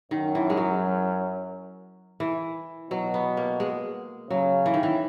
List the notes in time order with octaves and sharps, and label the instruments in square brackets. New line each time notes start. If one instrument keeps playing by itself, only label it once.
[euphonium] F#2 [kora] D#3
[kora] E3
G#3
F#3
E3
[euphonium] B2 [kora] F#3
[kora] B3
A#3
G#3
[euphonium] C#3 [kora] F#3
[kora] E3
D#3
E3